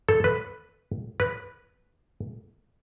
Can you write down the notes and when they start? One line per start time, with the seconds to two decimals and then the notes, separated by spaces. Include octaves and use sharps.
0.09 A4
0.24 B4
1.20 B4